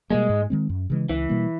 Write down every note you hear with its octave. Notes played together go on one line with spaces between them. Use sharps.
B2 G3 G#3 A#3
G#2
D#3 G#3 C4
F#2
C#3 E3 G#3
C#2 E3
B2 G3 A#3